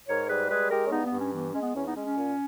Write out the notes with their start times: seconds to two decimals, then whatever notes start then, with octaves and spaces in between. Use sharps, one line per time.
0.08 G#2 A#4 C#5
0.29 G3 G#4 B4
0.50 G#3 G#4 B4
0.71 G#3 G4 A#4
0.87 C#4
0.91 G2 B3 D#4
1.06 B3
1.13 G2
1.20 C#4
1.34 E3 B3
1.54 G#3 C#4
1.62 B3
1.75 E2 C#4
1.85 B3 D#4
1.96 G#3 C#4
2.06 C#4
2.17 A#2